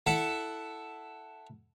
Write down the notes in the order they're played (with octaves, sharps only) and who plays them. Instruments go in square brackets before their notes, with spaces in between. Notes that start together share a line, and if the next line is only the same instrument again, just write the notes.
[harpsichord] E4 A4 E5 F#5